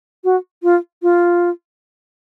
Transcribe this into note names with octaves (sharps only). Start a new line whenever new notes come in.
F#4
F4
F4